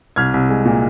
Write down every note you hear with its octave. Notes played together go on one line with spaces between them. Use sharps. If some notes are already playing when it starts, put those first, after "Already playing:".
C2 F6 G#6
C2
G#3
A#2